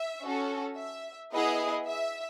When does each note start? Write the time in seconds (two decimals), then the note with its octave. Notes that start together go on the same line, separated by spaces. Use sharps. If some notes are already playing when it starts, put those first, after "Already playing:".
Already playing: E5
0.22 C#4 F#4 A4
0.77 E5
1.31 B3 E4 G#4 D#5
1.86 E5